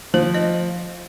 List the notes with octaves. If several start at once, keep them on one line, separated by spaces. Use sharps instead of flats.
F3 C5
D#5